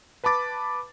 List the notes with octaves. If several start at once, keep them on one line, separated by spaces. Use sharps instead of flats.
B4 A5 B5 D6 A6